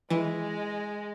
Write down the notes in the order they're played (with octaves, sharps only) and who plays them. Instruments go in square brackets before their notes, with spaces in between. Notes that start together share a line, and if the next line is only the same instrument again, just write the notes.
[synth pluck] E3 [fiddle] G#3